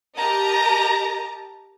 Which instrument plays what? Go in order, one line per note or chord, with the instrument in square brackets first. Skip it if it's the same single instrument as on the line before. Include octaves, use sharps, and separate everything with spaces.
[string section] G4 A#4 D#5 A5 A#5